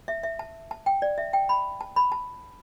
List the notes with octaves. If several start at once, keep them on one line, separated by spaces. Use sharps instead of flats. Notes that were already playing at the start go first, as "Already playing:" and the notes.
E5
E5
A5
A5
G5
D5
E5
G5
B5
A5
B5
A5